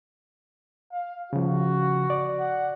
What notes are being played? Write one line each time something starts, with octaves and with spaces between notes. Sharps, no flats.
F5
C#3 F3 F#4
D5
F#5